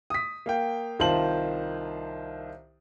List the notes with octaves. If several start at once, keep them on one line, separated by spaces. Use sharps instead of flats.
D#6 B6
A#3 F5 G5
C2 D#3 F4 C5 A5 F#7